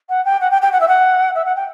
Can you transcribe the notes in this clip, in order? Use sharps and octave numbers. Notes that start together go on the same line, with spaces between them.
F#5
G5
F#5
G5
G5
F#5
E5
F#5
E5
F#5
G5